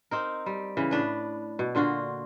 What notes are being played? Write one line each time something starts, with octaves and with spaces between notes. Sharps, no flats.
C4 D#4 A#4
G3
C#3 E3
A2 D4 B4
B2
A#2 D3 F4 F#4